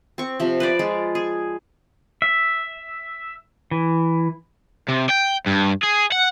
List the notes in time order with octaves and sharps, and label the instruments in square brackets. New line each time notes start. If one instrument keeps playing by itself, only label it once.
[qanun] C4 C#6
C3 F3
B4 C5 D5
G#3 F4
G#4
[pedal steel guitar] E5
E3
[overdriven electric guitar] C3
G5
G2
G#4
F#5